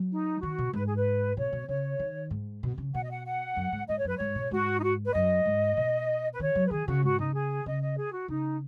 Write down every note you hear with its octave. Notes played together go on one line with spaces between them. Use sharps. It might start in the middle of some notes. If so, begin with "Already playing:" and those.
Already playing: F#3
D#4
D#3 F#4
B2
G#2 B4
G#4
B4
B2 C#5
B2
C#3 C#5
D#3
G#2
B2
C#3
B2 F#5
D#5
F#5
F#5
F#2
G#2
G#2 D#5
C#5
F#2 B4
G#2 C#5
B2
G#2 F#4
D#4
F#4
B4
F#2 D#5
G#2
B2
B4
D#3 C#5
F#3
B4
D#3 G#4
C#3 F#4
G#2 F#4
C#3 D#4
G#4
C#3 D#5
D#5
G#4
F#4
C#3 D#4